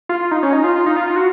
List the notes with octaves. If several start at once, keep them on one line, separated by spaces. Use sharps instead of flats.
F4
F4
D#4
C#4
D#4
F4
F4
D#4
F4
F4
F#4